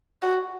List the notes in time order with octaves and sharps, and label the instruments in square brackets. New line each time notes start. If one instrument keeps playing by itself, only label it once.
[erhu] F#4